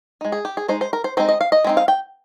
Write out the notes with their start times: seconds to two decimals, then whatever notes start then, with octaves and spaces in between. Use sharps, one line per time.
0.21 G#3 D#4
0.32 G#4
0.45 G4
0.57 G#4
0.68 G#3 D#4 C5
0.81 C5
0.93 A#4
1.04 C5
1.17 G#3 C4 D#4 C5
1.29 D#5
1.41 F5
1.52 D#5
1.64 G#3 C4 D#4
1.77 F5
1.88 G5